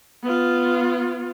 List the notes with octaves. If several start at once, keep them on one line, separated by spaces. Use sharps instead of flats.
B3 F4